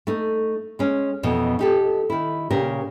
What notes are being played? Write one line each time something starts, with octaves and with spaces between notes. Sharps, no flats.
A3 D#4
G#3 C#4
F2 B2 E3
D#4 G4 A4
D#3 E4
A#2 C#3 G4 A#4